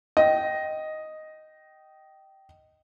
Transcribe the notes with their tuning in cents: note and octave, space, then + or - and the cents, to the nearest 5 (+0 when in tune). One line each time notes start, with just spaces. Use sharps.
D#5 +0 G5 -20